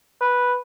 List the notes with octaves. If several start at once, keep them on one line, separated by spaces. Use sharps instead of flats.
B4